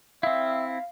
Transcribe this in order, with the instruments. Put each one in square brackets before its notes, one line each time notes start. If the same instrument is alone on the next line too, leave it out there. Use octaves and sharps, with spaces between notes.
[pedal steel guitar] C4 E4 [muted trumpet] E5 [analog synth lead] F5